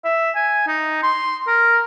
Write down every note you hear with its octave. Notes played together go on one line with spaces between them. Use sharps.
E5
G#5
D#4
C6
A#4